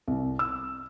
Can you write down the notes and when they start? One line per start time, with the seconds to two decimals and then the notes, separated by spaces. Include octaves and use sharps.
0.08 C2
0.39 E6